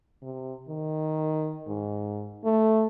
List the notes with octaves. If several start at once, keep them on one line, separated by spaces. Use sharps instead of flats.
C3
D#3
G#2
A3